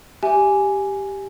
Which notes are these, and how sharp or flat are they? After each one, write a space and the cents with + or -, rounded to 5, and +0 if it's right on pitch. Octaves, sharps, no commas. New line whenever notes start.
G4 +0 E5 +0 G#5 +0